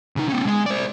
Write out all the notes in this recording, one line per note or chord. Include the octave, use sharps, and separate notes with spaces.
C#3 D#4
B3 C#4
G#3
C5 D5